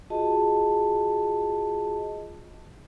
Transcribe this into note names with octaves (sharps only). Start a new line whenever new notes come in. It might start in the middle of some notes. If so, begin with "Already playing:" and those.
F4 F#4 G#4 D#5 A5